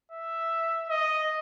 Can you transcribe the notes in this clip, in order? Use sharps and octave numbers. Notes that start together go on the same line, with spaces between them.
E5
D#5